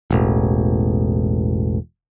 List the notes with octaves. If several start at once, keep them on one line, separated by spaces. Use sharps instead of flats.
E1 A1